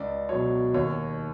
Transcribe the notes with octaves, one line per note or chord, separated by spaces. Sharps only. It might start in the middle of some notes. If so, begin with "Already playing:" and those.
Already playing: C#2 D5
B2 F#3 C#5
D#2 C#5